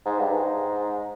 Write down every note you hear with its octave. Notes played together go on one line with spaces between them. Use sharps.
G#2
G2
G#2